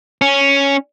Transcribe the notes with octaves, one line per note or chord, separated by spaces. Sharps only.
C#4